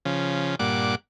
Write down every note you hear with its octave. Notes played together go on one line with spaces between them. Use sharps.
C#3 F3
G2 A#2 F#5 D6